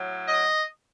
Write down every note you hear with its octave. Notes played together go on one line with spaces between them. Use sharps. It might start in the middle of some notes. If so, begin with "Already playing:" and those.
Already playing: A2 F#3
D#5